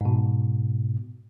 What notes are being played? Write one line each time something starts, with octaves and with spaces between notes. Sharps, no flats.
G#2 B2